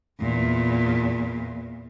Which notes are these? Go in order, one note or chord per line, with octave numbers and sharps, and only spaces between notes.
E2 A#2